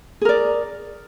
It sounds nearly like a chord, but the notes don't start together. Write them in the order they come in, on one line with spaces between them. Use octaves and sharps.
G#4 A#4 D5